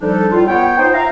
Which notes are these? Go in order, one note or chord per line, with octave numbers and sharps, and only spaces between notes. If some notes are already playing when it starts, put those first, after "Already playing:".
F3 G3 D4 D#4 A4
A2 G3 F4
B3 C#5 G5
D#4 F4 C5
E5 F5 A#5